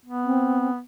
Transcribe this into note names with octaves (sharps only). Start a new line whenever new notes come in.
B3
C4